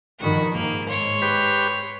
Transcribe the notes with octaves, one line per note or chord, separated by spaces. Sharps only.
G2 D#3 F3 F#4 B5
G#2 A#3
C#5 C6
G4 B4